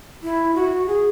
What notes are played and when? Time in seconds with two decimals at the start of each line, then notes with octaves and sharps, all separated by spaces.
0.23 E4
0.55 F#4
0.87 G#4